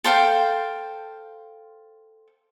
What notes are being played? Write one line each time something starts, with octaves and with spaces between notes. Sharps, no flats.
A4 C5 F5 G5